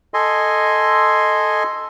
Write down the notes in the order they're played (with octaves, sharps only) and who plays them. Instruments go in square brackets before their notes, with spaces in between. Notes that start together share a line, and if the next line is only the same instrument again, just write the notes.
[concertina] A4 D#5 G#5 C6